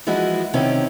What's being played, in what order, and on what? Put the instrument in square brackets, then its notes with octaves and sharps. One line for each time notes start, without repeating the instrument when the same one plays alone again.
[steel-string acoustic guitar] E3 F3 G#3 E4 F#4
C3 D#3 C4 C#4 E4 C5